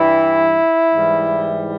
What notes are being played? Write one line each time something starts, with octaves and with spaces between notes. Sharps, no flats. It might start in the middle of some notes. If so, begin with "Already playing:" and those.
Already playing: G2 E3 G3 E4
G#2 E3 G3